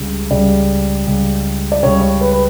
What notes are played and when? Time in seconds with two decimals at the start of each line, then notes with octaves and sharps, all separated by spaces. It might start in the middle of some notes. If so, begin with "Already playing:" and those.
Already playing: C#2 C#3 G3
0.30 C#2 C#3 G3 D5
1.06 C#2 C#3 G3
1.72 D5
1.83 C#2 C#3 G3 C#5
2.01 C#5
2.21 B4
2.32 B4